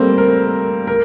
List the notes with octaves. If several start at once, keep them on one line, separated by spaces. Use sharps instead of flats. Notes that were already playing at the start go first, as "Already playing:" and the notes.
Already playing: G3 A3 A#3 C4
A#4
A#4